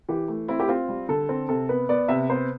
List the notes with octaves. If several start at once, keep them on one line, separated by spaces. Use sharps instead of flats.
E3 G4
A3
C4 E4
G4
C4 F4
G3
D3 A4
C4
C3 A4
B3 B4
B3 D5
C3 E5
B3 C5